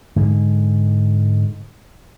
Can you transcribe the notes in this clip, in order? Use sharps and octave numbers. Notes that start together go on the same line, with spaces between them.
G#2 D3 G#3